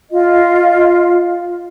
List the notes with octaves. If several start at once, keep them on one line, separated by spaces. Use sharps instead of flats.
F4 D#5